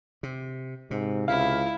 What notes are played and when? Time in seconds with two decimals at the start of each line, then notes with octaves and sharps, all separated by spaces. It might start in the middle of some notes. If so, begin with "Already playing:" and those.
0.23 C3
0.91 G#2 C3
1.28 C#2 E4 F5